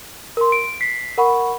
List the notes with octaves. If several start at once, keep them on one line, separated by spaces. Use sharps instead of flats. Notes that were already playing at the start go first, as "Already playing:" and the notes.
A#4 C6
D7
B6 C7
A#4 F#5 B5 C#6